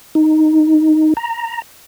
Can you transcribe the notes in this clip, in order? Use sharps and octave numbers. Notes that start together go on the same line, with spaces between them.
D#4
A#5